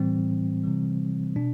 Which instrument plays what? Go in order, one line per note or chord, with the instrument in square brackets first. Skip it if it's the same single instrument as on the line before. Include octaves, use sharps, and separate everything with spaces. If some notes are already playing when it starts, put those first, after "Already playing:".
Already playing: [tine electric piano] A2 E3 G3 C4
C3 E3 G3
B2 D4